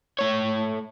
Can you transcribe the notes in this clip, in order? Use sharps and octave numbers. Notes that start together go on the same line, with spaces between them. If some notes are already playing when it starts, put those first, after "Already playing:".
A3 C#5